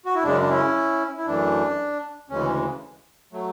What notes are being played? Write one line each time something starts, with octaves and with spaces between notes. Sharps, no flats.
F#4
E4
F#2 C#3 G#3 D4
D4
C#4 E4
E4
F#2 E3 A3 D4
D2 C#3 E3 G#3 C#4
F#3 A3